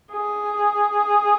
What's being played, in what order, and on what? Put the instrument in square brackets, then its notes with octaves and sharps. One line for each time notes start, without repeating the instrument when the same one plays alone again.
[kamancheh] G#4